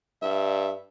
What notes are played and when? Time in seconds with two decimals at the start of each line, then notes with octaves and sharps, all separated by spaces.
0.22 G2 E5